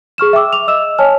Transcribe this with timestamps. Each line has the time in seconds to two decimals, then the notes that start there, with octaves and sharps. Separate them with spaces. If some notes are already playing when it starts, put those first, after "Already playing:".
0.18 G#4 C#6 F6 E7
0.33 E5 G5 D6 E6
0.53 D6 F7
0.68 D#5 E6 E7
0.98 C#5 G#5 A5 F6